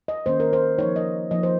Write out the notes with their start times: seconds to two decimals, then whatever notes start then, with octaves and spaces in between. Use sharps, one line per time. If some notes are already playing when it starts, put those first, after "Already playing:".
0.08 D#5
0.26 D#3 A#3 C#4 C5
0.40 A#4
0.53 C5
0.78 F3 A#3 D#4 C#5
0.96 D#5
1.31 F3 A#3 D#4 D#5
1.43 C5